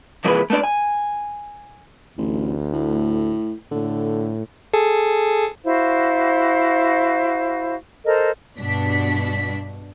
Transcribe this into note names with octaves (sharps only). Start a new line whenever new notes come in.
C3 E3 F3 A#3 G#4 B4
A3 B3 D4 D5
G#5
A1 D2
A2
A2 D3
G#4 A4
E4 F#4 C5 F5
A4 A#4 C5 D#5
G2 B2 D4 B6